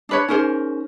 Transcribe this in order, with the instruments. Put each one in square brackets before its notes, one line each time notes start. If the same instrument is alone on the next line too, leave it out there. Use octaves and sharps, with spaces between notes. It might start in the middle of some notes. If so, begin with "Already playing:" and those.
[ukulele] D4 B4 C#5
[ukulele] C#4 A#4 C5 [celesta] D#4 G#4